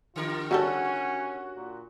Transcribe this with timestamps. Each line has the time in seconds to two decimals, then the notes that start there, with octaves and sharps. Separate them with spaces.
0.16 D3 F4 G4 A#4
0.51 C#3 G3 C#4 F#4 A4
1.56 A#2